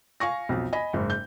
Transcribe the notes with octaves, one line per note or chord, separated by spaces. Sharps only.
F5 G#5 C#6 A#6
B1 F2
D#5 G#5 B5
F#1 G#2
G6